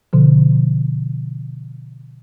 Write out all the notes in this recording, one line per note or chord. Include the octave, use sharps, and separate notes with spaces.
B2 D3 F3